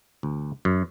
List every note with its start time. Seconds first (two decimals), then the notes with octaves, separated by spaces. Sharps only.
0.23 D2
0.65 F#2